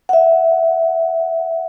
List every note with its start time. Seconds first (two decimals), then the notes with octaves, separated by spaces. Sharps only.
0.09 E5 F#5